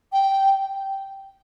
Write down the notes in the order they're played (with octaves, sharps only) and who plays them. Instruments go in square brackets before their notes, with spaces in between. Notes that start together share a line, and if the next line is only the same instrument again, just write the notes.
[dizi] G5